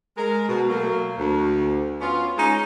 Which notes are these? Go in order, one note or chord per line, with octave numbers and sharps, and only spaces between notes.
G#3 A#4
B2
F#3 A3 A#3
D2
B3 C#4 F4
G#3 C#4 D#4